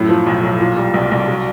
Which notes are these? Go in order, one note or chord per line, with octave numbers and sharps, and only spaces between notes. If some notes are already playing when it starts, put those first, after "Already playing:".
Already playing: F#2 A2
F3
B1
B1
A#2
G3
C2
C2
F#3